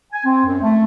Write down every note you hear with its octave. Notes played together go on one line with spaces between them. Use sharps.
G#5
C4
F#2
A3